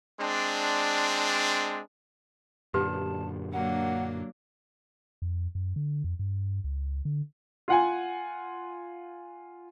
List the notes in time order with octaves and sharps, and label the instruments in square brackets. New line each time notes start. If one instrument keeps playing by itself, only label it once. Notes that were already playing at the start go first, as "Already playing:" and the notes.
[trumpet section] G#3 C4 D4
[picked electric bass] F#2 A#2 D3 [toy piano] G4 B4 [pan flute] A5
[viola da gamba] F#3 A#3 D4 [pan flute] F#5
[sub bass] F2
F#2
D3
F2
G2
C#2
D3
[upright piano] F4 F#5 G#5